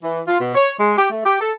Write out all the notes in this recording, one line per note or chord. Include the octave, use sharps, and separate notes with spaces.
E3
F4
B2
C#5
G#3
G4
A3
G4
A4